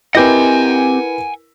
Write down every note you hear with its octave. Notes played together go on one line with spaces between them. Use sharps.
C4 E4 G4 A#4 B4 D#5 F#5 G#5